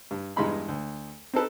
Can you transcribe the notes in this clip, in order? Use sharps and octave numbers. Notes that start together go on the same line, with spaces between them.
G2
E2 G2 G#3 D#4 B5 C6
D2
C4 D#4 A4 B4